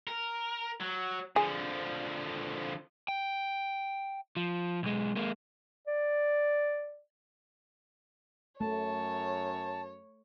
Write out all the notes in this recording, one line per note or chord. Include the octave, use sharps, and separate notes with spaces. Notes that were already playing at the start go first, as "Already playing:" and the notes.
A#4
F#3
D3 F3 G#4
G5
F3
B1 G#3
G#3 A#3
D5
F#2 A3 C#5 A5